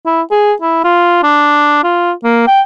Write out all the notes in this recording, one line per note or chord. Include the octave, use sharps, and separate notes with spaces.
E4
G#4
E4
F4
D4
F4
A#3
G5